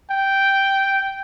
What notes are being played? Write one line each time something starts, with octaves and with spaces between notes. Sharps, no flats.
G5